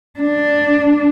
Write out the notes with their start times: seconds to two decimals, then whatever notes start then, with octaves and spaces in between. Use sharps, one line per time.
0.19 D4